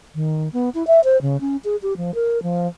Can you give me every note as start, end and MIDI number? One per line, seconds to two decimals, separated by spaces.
0.15 0.49 51
0.53 0.70 59
0.74 0.86 64
0.87 1.00 76
1.04 1.20 72
1.22 1.40 49
1.41 1.57 61
1.64 1.76 68
1.82 1.97 67
1.97 2.14 53
2.15 2.42 70
2.43 2.68 53